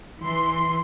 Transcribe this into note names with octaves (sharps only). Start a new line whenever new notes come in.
E3 C6